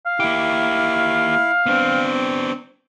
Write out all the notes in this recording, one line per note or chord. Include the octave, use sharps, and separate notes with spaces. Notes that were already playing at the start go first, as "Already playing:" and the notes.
F5
A#3 E4 G4
B3 C4 D4